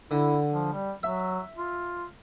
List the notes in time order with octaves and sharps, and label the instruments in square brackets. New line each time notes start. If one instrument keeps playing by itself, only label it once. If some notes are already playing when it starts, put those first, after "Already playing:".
[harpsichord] D3 [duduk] E4
[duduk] F3
G3
[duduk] F#3 [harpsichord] E5
[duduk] F4